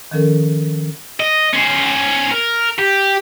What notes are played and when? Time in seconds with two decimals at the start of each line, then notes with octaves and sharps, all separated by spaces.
0.11 D#3 F3 C#4 A4 A#4
1.20 D#5
1.54 C#4 C5
2.31 A#4
2.78 G4